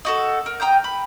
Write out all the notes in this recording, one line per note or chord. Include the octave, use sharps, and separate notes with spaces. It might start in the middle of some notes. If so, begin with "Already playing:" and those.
D#4 F#4 A4
A#4
G5 A#5 D#6 G6
B5